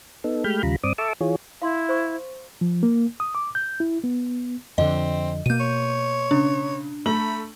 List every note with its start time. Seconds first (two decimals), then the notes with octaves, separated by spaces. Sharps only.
0.24 B3 D#4 A4
0.44 G#3 A3 G4 B5 F6 G6
0.63 D#2 C#3 G3 F4 A#5 B5
0.83 G2 C4 D5 D6 D#6
0.98 A4 E5 A5 C#6 D6 E6
1.21 E3 F4 G#4 C#5
1.62 E4 F5 C6
1.89 C5 C#6
2.61 F3
2.83 A#3
3.20 D#6
3.35 D6
3.55 G6
3.80 E4
4.04 B3
4.78 F2 D3 C4 D#5
5.46 B2 A#3 G6 D#7
5.60 C#5
6.31 C#3 D4
7.06 A3 B5 F#7